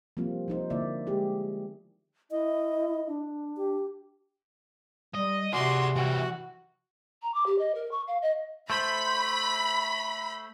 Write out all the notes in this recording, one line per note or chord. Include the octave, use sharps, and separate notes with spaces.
F3 G3 A#3 C4 F4
F3 D#4 C5
D3 A#3 E4 D5 E5
G#3 G4 G#4
E4 D#5
D4
G4
G3 D#5
C3 F#4 G#4 D5 C6
E3 G3 F#4
A#5
D6
G4
D#5
A#4
C#6
F5
D#5
A3 C5 B5